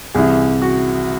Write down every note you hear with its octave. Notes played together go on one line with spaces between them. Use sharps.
C2 C3 E3 G#4
F#4